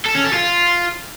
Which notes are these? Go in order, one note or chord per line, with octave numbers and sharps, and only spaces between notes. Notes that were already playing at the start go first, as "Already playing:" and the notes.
A4
C#4
A4
F4